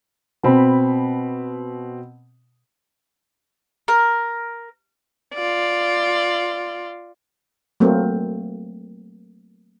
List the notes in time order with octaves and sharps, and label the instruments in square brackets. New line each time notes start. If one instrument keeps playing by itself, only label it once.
[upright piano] B2 C4 B5
[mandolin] A#4
[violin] F4 D5
[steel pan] F#3 A3 A#3 C4